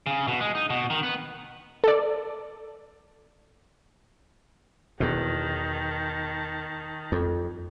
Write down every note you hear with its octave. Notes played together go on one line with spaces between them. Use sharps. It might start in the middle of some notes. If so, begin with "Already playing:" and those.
C#3
B2
G#3
D#4
B2
D#3
B3
A4 D5
E2 B2 D#3 A5
F2